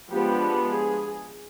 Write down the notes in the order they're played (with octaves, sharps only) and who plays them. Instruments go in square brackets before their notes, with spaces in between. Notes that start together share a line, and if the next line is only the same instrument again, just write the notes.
[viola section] F3 G#3 B3 D4 G4
G#4